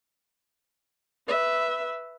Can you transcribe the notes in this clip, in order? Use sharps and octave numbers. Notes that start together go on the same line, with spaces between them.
B4 E5